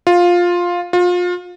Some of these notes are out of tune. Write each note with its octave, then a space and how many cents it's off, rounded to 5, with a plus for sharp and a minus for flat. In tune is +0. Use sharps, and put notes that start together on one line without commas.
F4 +10
F4 +30